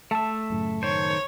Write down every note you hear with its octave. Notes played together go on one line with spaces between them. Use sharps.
A3 E5 A5
F#2 A2 C#3
D#3 C5 C#5